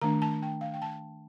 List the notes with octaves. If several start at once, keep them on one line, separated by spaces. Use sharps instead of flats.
D#3 A3 D4 A#5
A5
G5
F5
G5
A5